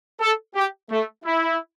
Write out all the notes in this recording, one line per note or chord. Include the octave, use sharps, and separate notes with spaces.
A4
G4
A3
E4